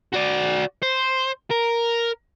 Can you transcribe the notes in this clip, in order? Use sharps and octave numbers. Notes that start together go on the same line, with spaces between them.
F#4 D5
C5
A#4